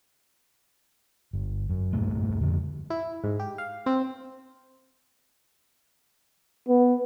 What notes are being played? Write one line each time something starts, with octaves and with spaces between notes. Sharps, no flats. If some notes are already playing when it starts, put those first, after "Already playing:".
G1
F#2
C2 G2 A#2 A3
F2 D3 F3 G3
E4
G#2
G4
F5
C4
B3